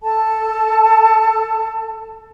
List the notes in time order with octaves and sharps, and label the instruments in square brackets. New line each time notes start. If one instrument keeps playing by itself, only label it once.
[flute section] A4 A5